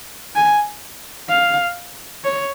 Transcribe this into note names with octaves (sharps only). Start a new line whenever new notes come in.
G#5
F5
C#5